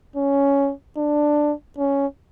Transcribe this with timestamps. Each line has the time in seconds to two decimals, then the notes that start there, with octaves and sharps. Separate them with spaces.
0.16 C#4
0.97 D4
1.78 C#4